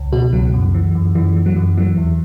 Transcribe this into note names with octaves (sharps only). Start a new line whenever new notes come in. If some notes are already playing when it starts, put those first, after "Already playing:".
Already playing: C#2
B2 F#4
C#2 F#3
F#2
E3
F#2
F#2 E3
E3
F#3
F#2
E3 F#3
E2